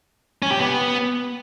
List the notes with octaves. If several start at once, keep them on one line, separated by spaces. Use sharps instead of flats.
C#4
G4
B3